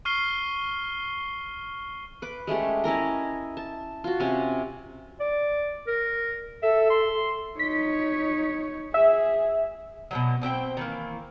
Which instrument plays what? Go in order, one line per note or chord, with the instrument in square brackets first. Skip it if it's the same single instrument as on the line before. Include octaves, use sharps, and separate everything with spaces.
[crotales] C#6 F6 C7 G7
[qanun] B4 D6
G#3 A3 C#4 G4
C#4 E4 A#4 D#5
A5
F4 F#4
C3 C#4
[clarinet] D5
A#4
[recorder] A4 [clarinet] E5
[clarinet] C6
[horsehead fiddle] D#4 C#5 [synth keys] B6
[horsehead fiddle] G#4 [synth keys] E5
[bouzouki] B2 D#3 F#3
B2 C4 E5 G5
D#3 E3 A#3